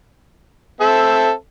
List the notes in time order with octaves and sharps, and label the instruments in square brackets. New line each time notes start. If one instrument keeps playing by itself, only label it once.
[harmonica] C4 A4 E5